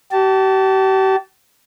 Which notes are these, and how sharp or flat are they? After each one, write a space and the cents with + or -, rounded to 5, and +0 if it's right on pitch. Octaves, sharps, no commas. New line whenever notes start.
G4 -40 A5 +0